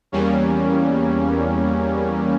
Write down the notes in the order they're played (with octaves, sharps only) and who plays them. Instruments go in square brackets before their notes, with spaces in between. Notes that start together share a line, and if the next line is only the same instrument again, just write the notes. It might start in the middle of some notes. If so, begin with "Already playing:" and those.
[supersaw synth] E2 G3 A#3 C#4